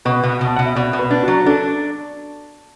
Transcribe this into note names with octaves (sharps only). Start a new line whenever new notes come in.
B2 B4
B2
B2
A5
B2 F#5
E5
B2 D5
B2
B4
D4
F#3 F#4
D4 A4